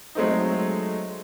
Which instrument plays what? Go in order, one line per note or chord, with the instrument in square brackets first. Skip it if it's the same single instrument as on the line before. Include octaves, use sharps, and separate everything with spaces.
[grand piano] F#3 G#3 A3 C4 D#4